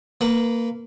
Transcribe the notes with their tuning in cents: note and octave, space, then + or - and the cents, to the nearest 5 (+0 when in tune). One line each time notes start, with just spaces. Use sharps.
A#3 -15 B4 +0